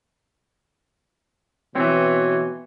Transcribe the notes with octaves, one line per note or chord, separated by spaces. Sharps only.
B2 E3 C4 C#5